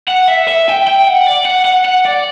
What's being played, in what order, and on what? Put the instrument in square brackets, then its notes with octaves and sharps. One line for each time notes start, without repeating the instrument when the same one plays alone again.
[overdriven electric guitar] F#5
E5
E5
G5
G5
F#5
D5
F#5
F#5
F#5
D5